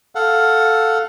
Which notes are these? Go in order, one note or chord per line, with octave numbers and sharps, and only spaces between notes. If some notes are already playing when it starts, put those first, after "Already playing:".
A4 F5 F#5